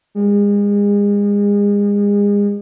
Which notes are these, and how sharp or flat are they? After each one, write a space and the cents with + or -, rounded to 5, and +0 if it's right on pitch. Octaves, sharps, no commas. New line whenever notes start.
G#3 -35